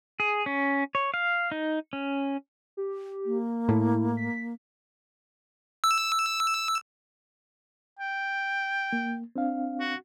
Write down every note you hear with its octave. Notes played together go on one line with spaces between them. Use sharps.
G#4
C#4
C#5
F5
D#4
C#4
G4
A#3
A2 E4
B6
E6
G5
A#3
C4 D4 F5
F#4